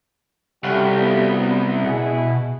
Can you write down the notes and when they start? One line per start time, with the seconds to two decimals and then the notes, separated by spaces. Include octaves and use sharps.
0.63 C2 G3 A3 C#4 F#4 G4 F5
1.00 B3
1.85 B2 G#3 E4 G#4 F#5